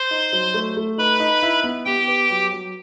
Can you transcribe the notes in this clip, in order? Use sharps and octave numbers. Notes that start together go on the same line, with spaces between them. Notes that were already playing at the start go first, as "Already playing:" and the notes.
Already playing: C5 C6
D#4
F#3
A3
A3
D#4 B4 B5
D#4
E4
B3
B3 G4 G5
B4
F#3
F#3